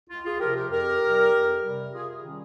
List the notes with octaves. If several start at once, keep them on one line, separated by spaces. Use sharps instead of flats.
C#2 F4
F4 G#4
C3 F3 G4 A#4
G4 A#4
F2 G4 A#4
C3 G3
F2
G3
C3
C3 F4 G#4
D#3 G3 C#4